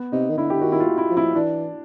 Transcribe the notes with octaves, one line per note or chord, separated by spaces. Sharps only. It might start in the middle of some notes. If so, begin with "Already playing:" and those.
Already playing: B3
C3 D#4
D#3
D3 E4
D3 G4
D#3 F#4
E4
F4
E4
F3
E4
E3 D4